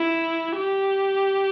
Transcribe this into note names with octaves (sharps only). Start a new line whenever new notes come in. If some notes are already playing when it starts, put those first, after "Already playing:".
Already playing: E4
G4